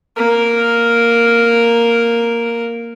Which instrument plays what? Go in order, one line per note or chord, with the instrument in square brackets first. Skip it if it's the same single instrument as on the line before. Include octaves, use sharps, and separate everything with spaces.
[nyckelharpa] A#3 A#4